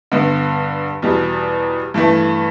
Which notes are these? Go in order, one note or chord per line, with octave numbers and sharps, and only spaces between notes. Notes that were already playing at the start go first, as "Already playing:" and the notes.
G2 D3 B3
E2 B2 G3
G2 E3 A3